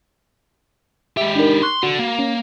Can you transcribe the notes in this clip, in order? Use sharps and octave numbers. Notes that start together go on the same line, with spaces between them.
G#3 G4 E5
D4 D#4 A#4
C6 C#6 F#6
D3 F#4
A#3
C#4